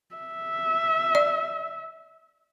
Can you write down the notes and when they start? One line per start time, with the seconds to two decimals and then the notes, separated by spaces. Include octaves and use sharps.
0.15 E5
1.15 D5